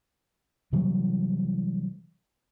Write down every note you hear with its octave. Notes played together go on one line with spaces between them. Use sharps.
C3 E3 F#3 G3